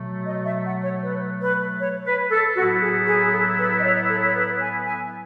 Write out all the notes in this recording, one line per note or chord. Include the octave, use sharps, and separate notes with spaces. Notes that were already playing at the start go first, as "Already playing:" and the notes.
Already playing: B2 F#3 A3
D#5
E5
F#5
C#5
B4
B4
C#5
B4
A4
A2 F#3 B3 E4 F#4
G#4
G#4
A4
B4
D#5
C#5
A4
C#5
B4
G#5
G#5